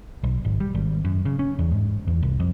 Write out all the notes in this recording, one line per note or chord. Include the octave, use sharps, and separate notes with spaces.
B1
G#1
G3
G#1
F#2
C#3
C#4
E2
G#2
E2
C2
F2